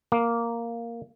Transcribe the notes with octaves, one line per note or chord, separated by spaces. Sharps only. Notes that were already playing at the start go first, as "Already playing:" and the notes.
A#3